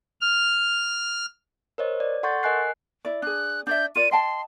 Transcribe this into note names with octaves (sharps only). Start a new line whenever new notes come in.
F6
A#4 C5 C#5 D#5
D5
A4 F#5 C6 C#6 G6 A6
A#4 D#5 G#5 F#6 C7
E4 D5
D4 G#4 F#6
D4 D5 E5 G6
F4 A#4 D5 D#7
D#5 G5 A5 C6